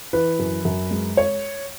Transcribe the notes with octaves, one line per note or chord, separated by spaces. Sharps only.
E3 B4
F#2
F#2
G#3
C#5